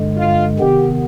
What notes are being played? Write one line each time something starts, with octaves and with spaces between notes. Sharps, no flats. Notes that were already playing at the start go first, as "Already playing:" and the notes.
Already playing: G2 D3 G#3
F4
C3 D#3 B3 G4